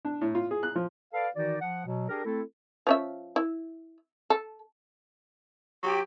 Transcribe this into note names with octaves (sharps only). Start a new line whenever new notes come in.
D4
A2
F4
G#4
F#6
F3
A4 B4 D5 F5
D#3 E3 D#4 F#4 D5
F3 F#5
B2 F#3
D4 G4 G#4 A#4
A3 C4 E4 A4
F3 C#4 E5
E4
A4
F#3 G4